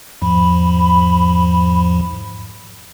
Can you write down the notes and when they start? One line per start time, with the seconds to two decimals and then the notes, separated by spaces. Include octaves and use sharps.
0.22 E2 G#2 F3 B5